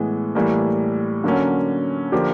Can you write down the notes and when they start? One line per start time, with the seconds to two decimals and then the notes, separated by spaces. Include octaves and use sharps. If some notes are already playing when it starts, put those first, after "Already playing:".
Already playing: A2 E3 G#3 B3
0.35 A2 E3 G3 A#3
1.24 D3 F#3 A#3 C#4
2.12 D3 F3 A#3 D4 G4